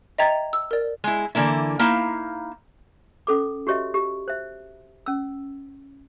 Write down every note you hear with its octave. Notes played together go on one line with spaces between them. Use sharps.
D#5 E5 G5 A#5 G#6 A6
E6
A#4 D5
G#3 E4
D3 E3 A#3 E4
A#3 D#4 E4 F5
C#4 A4 D6
F#4 G4 C#5 D#5 E5
G4
C5 E5
C#4 E6